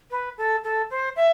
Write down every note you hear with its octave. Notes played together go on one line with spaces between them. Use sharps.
B4
A4
A4
C5
E5